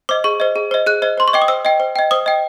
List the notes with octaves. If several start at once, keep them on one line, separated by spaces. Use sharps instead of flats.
C5 D#5 D6
G#4 C#6
C5 D#5
G#4
C5 D#5
G#4 F#6
C5 D#5
C5 C6
C#6
D#5 G5 D6
D#6
C5 E6
D#5 G5
C5
D#5 G5
C5 D#6
D#5 G5